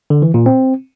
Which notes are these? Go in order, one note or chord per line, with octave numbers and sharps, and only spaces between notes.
D3
E3
A#2
C4